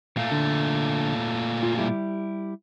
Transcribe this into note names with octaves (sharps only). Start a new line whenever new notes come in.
A#2 A3 F5
D3
F4
G3 E4 G4